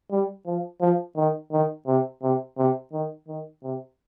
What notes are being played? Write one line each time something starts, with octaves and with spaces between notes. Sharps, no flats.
G3
F3
F3
D#3
D#3
C3
C3
C3
D#3
D#3
C3